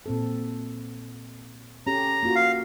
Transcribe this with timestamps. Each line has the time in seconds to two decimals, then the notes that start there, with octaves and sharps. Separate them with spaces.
0.06 A#2 C4 A4
1.87 C#4 G4 A4 A#5
2.23 A#3 F4 F#4
2.35 F5